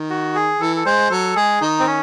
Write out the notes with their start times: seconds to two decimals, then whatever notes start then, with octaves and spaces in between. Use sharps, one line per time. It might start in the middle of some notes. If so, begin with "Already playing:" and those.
Already playing: D#3
0.10 F#4
0.35 G#4
0.60 E3 A4
0.76 A4
0.85 G#3 C5
1.10 F#3 A4
1.35 G#3 G#4
1.61 D#3 D#4
1.79 C4
1.86 C#4